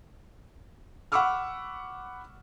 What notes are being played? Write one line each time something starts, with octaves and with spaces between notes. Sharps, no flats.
F#5 B5 C#6 D6 E6 F6